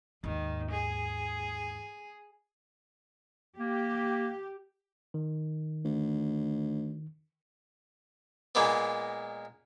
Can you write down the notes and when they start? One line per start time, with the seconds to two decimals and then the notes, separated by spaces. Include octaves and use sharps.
0.24 D#2 G#2 D#3
0.71 G#4
3.58 A#3 G4
5.14 D#3
5.85 D2
8.55 A#2 G#3 A#3 B3